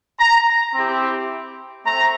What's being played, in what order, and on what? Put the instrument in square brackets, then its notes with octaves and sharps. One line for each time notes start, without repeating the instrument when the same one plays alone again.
[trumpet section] A#5
C4 E4 G4
A3 C4 A#5